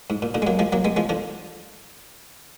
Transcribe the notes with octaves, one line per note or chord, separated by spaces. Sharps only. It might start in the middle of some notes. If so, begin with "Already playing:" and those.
G#2
A#2
A#2 D3
G#3
F#3 A#3
F3 G#3
F#3 A#3
G#3 B3
F3 G#3
D3 F3